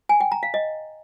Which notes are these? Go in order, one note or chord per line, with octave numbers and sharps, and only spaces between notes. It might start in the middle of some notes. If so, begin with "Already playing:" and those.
G#5
G5
A#5
F5
D#5